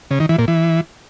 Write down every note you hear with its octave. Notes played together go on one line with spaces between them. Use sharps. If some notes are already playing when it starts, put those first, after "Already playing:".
C#3
D#3
E3
A#2
E3